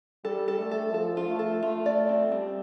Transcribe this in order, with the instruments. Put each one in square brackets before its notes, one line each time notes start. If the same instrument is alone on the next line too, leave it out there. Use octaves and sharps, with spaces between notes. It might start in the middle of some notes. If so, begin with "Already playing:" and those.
[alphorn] G3 [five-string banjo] A4
[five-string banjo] A4
[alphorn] A3
[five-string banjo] A4
[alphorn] F3 [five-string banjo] A4
[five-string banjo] F4
[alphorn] A3
[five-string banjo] A4
[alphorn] A3 [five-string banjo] F4
[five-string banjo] D5
C4
[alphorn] G3 [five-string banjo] C4